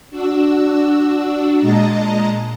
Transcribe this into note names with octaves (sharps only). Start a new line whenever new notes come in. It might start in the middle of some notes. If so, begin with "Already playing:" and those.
D4 F#4 E6
A#2 G#3 D#5 A5 A#5